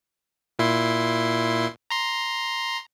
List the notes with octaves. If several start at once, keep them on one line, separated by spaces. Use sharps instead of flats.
A#2 E4 C6
A#5 C6